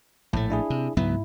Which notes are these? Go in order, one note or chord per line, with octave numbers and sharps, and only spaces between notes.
A#1 A2 A3
D4 E4 G#4
C3
C#2 G#2 F#3 B3 E4